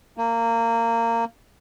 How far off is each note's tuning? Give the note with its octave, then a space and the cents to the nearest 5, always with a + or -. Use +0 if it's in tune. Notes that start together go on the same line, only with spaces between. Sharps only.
A#3 -20